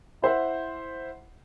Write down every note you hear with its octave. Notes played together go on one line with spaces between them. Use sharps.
E4 C5 E5 F#5